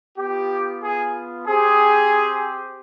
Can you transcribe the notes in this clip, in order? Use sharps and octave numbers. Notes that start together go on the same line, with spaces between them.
B3 F4 G4
G#4
C4 G4 G#4